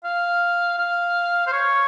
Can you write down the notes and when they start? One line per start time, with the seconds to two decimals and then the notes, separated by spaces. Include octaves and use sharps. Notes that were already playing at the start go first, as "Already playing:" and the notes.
0.04 F5
0.78 F5
1.47 C5
1.53 C#5